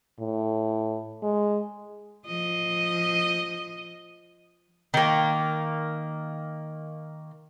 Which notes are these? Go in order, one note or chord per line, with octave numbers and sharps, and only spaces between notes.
A2
G#3
F3 D#5
D#3 A#3